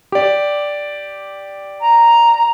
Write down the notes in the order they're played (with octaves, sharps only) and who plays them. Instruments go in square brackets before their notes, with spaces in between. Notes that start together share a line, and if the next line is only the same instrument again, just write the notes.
[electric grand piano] G4 D5
[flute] A#5